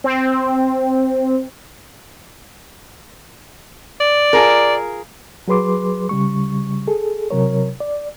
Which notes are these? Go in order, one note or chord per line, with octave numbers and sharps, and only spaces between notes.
C4
D5
F4 G#4 A#4
F#3 G#4 B4 C6 D6
C#3 G3 C#6
G#4 A4
C3 F#3 A#4 C#5
D5